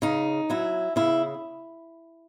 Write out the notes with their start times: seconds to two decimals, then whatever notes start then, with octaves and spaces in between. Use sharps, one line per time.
0.02 C#3 D#4
0.50 F#3 E4
0.96 C#3 E4